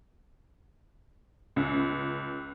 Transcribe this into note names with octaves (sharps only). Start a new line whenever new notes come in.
C#2